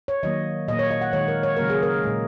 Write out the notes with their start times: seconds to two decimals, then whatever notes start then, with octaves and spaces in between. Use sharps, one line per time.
0.08 C#5
0.23 D#3 F#3 A#3 D#5
0.68 A#2 A#3 D#5
0.79 C#5
0.91 D#5
1.01 F#5
1.13 D#3 G#3 C#5
1.28 A#4
1.43 C#5
1.57 C#3 F#3 A#3 A#4
1.70 G#4
1.83 A#4
2.03 A#2 G#3